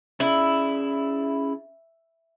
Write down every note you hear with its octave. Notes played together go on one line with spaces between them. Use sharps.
C#4 E4 G#4 D5